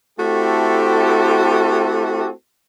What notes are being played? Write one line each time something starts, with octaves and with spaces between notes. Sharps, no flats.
A3 C4 E4 F#4 G4 A4